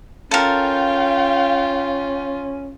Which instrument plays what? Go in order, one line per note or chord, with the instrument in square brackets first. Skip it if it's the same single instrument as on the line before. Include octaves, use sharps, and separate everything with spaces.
[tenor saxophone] C#4 [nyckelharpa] F4 [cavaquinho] A4 A#4 [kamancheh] F5 G5